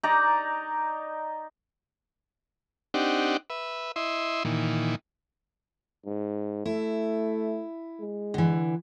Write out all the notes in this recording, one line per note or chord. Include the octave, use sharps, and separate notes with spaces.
D#4 D5 A#5
C4 D4 D#4 G4 F#5
B4 E5
E4 D#5 E5 C6
A#2 D#3 E3
G#2
A3 E4
G#3
D3 E3